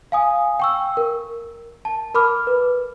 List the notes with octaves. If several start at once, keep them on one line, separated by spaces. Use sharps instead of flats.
F5 G#5 D#6
G5 C#6 E6
A#4
A5
A#4 B5 D6 F6
B4